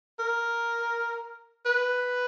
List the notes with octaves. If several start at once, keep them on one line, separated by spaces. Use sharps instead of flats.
A#4
B4